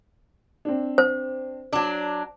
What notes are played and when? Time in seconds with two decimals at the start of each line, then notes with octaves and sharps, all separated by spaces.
0.65 C4 D4
0.98 C5
1.73 F#3 D4 D6